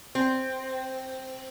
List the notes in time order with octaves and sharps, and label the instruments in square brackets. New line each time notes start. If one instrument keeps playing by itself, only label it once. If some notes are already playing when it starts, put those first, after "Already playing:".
[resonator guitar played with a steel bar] C4